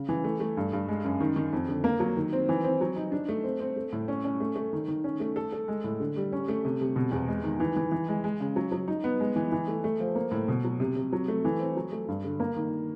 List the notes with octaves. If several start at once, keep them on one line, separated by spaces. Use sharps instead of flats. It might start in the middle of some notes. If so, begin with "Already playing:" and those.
Already playing: C#3
E3
A3
A3
G2
G2
G#3
F#2
D#3
D#3
F2
D3
A#3
F#3
D#3
C4
E3
C4
F#3
D#4
D4
A3
C4
C4
A3
A2
C#4
C#4
A3
A3
D#3
D#3
C#4
A3
A4
A4
G#3
A2
D3
G3
C#4
A3
C3
C3
B2
E2
G#3
D#3
E3
E3
E3
G#3
G#3
C#3
F#3
F#3
D#4
B3
G#3
E3
E3
A3
A3
F3
A#3
A2
B2
F#3
C3
C3
F#3
A3
E3
C4
F#3
A3
G2
D3
A#3
D#3